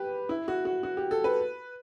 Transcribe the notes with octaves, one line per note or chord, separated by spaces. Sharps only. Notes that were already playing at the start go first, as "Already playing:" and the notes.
Already playing: G4 B4
E4
F#4
F#4
F#4
G4
A4
B4